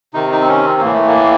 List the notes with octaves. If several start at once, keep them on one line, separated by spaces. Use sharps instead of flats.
C3 D#3 D#4
D#4
C4
C#4
C4
A2 E3 A#3
A3
A#3